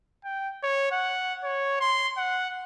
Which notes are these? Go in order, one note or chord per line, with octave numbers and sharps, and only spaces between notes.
G5
C#5
F#5
C#5
C6
F#5